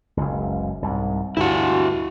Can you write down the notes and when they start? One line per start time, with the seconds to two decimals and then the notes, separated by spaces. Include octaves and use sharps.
0.17 F#1 C#2
0.82 C2 G#2
1.37 D2 G2 E4 F#4